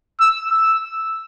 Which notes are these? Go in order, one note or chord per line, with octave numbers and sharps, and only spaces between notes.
E6
E6